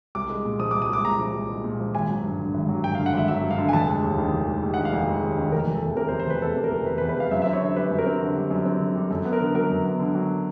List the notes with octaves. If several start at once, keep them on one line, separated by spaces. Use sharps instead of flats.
C2 D6
G#3
A#2
F3 D#6
D6
C2
D#6
G#3 D6
A#2 A#5
F3
C2
G#3
A#2
F3
G#1 G#5
F#3
G2
D3
G#1
F#3
G2 G5
F5
D3
F#5
G#1 E5
F#3 E5
G2
F5
D3
G#5
F1 A5
G#3
D#2
D#3
F1
G#3
D#2
F#5
D#3
F5
F1
G#3
D#2
D#3
F1 A#4
F1
A4
E2
C3 A#4
C5
F1
C5
F1 B4
E2 A4
C3
A#4
F1
F1 B4
B4
E2
B4
C3 F5
F#2 E5
E5
C4
C#5
D3 C5
G3 B4
F#2
A#4
C4
D3
G3
F#2
C4
D3
G3
F#2 A4
B3
A#4
D3
F#3 A#4
F#2
B3
D3
F#3